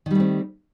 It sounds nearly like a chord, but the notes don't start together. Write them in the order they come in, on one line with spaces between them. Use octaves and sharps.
D#3 G3 A3 C4